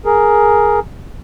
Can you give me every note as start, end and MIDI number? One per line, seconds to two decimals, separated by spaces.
0.05 0.80 68
0.05 0.80 70